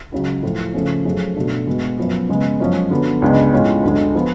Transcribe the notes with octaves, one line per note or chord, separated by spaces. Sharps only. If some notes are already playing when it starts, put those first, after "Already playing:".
C#2 C#3 F#3
A2 F3 A3 F4
C#3 F3 A3 C#4
F#2 F3 A3 C#4 G#4
B2 A3 D4
B2 G#3 B3 F#4
F#2 F3 B3
C#3 G#3 B3
F#2 F3 G#3 C#4
D3 F#3 B3
C#2 C#3 G#3 B3 D4
A2 G#3 C#4 F4
D2 D3 G#3
F3 B3 F4